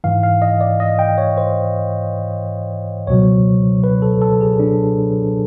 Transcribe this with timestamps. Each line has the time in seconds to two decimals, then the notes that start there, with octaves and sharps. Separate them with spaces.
0.04 G#2 E3 F5
0.23 F5
0.42 D#5
0.61 D5
0.80 D#5
0.99 G5
1.18 C#5
1.37 C5
3.07 C#2 B2 F#3 C#5
3.84 B4
4.02 A4
4.22 A4
4.41 G#4
4.60 D4